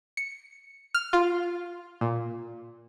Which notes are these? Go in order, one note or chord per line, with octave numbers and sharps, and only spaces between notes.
C#7
F6
F4
A#2